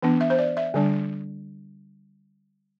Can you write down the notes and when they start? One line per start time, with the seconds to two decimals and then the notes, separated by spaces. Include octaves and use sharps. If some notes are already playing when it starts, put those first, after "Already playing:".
0.02 E3 B3 D4
0.21 E5
0.30 C5
0.38 D5
0.57 E5
0.74 D3 G3 D4